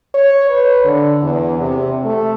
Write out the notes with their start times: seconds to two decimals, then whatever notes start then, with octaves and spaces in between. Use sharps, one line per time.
0.15 C#5
0.50 B4
0.85 D3
1.22 E2
1.60 C3
2.05 A3